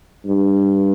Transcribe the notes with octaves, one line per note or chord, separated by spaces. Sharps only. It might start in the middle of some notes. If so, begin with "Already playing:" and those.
G2